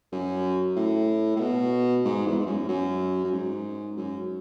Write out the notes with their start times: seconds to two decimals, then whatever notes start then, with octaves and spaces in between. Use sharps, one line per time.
0.12 F#2
0.76 A2
1.36 A2
1.40 B2
2.05 G#2
2.26 E2
2.39 G#2
2.47 F#2
2.69 F#2
3.25 F#2
3.33 G#2
3.97 F#2